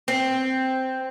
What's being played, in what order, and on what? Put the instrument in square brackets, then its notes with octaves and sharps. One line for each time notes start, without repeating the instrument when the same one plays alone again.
[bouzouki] C4